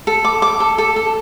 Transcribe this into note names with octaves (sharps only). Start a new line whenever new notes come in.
A4
D6
D6
A4
A4
A4